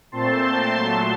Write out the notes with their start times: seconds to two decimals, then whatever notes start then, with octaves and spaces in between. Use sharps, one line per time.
0.12 A#2 A3 C4 A5 C6
0.74 A#2 F#3 A3